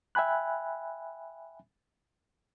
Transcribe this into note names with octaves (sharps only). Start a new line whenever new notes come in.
E5 G5 G#5 B5 F#6